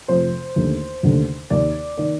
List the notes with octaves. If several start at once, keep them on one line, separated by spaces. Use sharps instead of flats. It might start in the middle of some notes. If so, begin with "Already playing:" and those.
F2 C3 F3 A3 C5
D#2 D3 A3
D#2 D3 A3
D#2 D#3 A#3 D5
D#3 A#3 D5